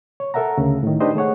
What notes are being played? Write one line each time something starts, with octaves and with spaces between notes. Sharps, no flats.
C#5
A4 A#4 E5 F#5 A#5
D2 C#3
A2 D#3
D4 D#4 G4 B4 C5 D#5
A3 G#4 C#5 F#5